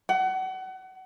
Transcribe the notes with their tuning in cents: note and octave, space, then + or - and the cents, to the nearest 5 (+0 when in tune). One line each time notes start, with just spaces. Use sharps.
F#5 +30